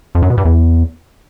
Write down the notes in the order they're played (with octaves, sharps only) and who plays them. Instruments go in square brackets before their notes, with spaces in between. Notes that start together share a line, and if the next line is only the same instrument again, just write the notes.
[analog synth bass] F2
F#2
B2
G2
E2